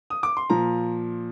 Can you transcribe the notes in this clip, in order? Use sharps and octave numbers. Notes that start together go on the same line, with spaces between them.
D#6
D6
C6
A#2 F3 A#5